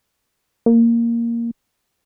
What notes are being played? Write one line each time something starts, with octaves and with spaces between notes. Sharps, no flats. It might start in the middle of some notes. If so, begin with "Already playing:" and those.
A#3